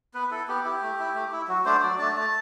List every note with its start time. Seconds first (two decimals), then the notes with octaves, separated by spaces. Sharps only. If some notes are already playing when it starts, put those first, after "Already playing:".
0.14 B3 B4
0.31 E4 A4
0.48 B3 G4
0.65 E4 G4
0.82 A3
0.99 E4
1.15 A3
1.32 E4
1.48 F#3 F#4
1.65 A3 D4 C5
1.83 F#3 D5
1.99 A3 D4 A5
2.16 A3 A5